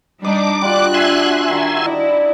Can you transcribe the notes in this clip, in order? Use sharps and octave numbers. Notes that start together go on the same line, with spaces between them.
G3 D4 D#4 D#5 D6
G3 D4 F4 F#4 F#6
E5 G#5 C6
D#3 D4 F#4
D4 E4 D#5